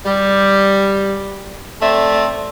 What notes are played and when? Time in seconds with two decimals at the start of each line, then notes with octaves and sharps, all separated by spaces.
0.06 G3
1.82 A3 C4 D5 E5